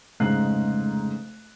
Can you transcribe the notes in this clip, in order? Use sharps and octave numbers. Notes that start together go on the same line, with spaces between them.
F1 G#2 C#3 D#4 F#6 C7